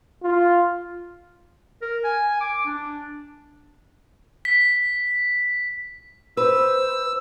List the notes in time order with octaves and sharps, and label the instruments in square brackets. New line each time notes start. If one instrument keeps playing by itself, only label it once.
[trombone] F4
[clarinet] A#4
G#5
D6
D4
[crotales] B6
[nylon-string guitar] B4 [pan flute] C5 [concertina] E6